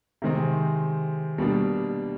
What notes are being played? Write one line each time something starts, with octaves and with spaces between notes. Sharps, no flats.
C3 D#3 G#3 C4
B2 G3 A#3 D4